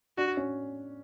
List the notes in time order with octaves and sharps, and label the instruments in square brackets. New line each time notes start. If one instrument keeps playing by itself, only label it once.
[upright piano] D4 [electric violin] F#4
[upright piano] C#4